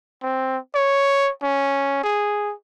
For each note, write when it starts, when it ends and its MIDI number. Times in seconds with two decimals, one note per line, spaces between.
0.23 0.57 60
0.75 1.30 73
1.42 2.00 61
2.03 2.53 68